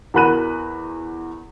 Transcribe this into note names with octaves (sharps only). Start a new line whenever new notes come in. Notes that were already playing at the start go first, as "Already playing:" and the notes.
E2 F#4 A#4 B5 F#6 D#7